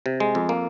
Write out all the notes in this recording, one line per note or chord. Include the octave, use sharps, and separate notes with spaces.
C3
G#3
F2
A#3